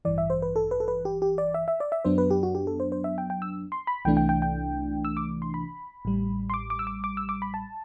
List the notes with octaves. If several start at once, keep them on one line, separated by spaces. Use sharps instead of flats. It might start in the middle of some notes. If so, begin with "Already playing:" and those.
A1 G2 E3 D5
E5
C5
B4
A4
B4
A4
B4
G4
G4
D5
E5
E5
D5
E5
F#2 F#3 B3 D4 C5
B4
G4
F#4
G4
A4
C5
C5
E5
G5
G5
E6
C6
B5
C2 C3 E3 A3 D4 G5
G5
G5
G5
E6
D6
C6
B5
A1 A2 G3
C6
D6
D6
E6
D6
D6
E6
D6
B5
A5